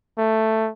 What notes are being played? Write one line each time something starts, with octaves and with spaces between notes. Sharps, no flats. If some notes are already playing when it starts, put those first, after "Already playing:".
A3